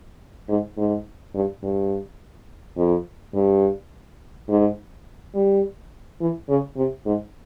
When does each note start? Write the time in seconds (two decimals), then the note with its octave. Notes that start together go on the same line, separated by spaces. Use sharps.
0.49 G#2
0.77 G#2
1.35 G2
1.63 G2
2.77 F2
3.34 G2
4.49 G#2
5.35 G3
6.20 E3
6.49 C#3
6.77 C3
7.06 G#2